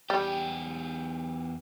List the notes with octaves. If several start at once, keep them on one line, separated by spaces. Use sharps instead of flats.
E2 G3 G4